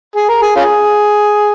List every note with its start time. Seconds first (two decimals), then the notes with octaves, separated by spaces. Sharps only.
0.16 G#4
0.29 A#4
0.42 G#4
0.56 C#4 F4 G#4